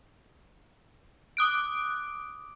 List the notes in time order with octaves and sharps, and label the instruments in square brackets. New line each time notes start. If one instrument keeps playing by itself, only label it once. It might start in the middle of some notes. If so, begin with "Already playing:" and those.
[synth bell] D6 D#6 F#6 D7